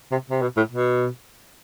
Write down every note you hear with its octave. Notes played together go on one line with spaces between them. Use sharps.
C3
C3
B2
A2
B2